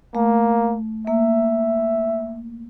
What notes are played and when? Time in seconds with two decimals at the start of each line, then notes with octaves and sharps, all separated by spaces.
0.15 A3 A#3
1.07 A#3 E5